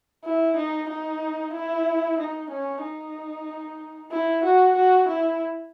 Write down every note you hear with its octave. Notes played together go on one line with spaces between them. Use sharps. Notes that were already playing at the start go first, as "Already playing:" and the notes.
E4
D#4
D#4
E4
D#4
C#4
D#4
E4
F#4
F#4
E4